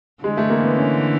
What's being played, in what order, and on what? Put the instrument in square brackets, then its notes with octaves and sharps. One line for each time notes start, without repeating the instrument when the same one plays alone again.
[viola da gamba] D3 E3 [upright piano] G#3
[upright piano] A3
A#3
B3
C#4